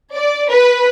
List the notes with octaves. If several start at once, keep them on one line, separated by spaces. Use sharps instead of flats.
D5
B4